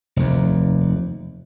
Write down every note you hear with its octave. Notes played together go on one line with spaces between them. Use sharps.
F1 D#2